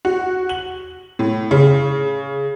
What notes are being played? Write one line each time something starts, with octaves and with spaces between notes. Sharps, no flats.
F#4
F#7
A2
C#3